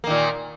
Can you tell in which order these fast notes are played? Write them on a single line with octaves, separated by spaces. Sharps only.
A#3 D#3 A#2